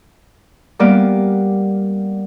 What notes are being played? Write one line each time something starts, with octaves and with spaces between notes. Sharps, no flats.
G3 A#3 B3 D5